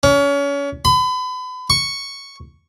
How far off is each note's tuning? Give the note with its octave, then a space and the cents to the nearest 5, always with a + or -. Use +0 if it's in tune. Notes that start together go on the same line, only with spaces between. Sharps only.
C#4 +30
B5 +35
C#6 +0